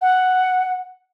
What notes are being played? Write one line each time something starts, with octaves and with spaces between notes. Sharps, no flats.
F#5